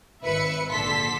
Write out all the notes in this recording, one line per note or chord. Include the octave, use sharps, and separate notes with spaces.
G#1 B4 E5 C#7
A#1 D3 A4 C6 B6